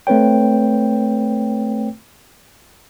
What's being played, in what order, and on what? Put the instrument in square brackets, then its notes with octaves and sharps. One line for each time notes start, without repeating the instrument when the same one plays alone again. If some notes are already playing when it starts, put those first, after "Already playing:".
[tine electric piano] A3 C4 B4 C#5 G5